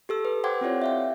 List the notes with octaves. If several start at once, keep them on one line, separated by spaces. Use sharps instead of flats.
G4 A4 E6
B4
C5 F#5 G5 C6 D6 G#6
C4 E4 F4 G4 C#5 D5
E5 F5 G5